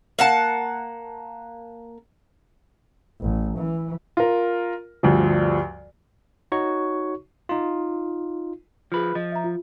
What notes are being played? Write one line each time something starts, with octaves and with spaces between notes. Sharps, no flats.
A#3 F#5 A5
A1
E3
F4 A#4
D2 G2 F3
D#4 F#4 C#5 C#6
D#4 F4
F3 F4 G#4 B4
F3 D#5
E5 A#5
F4